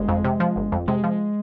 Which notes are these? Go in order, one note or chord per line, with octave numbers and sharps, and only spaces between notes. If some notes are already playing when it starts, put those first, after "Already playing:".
Already playing: G1 G#3
F2
C3
F3
G1
F2
C3 G#3
F3